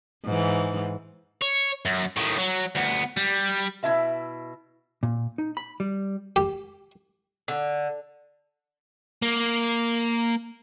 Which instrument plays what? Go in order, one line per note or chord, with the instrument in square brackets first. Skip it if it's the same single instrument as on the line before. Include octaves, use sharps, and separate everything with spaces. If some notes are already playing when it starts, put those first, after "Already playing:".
[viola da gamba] G#2 E3
[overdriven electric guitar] C#5
F#2
A2 D#3
F#3
D2 B3
G3
[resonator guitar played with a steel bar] B2 E4 F4 E5 A5
[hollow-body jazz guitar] A#2
D#4
B5
G3
[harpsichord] G4
[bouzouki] D3
[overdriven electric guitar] A#3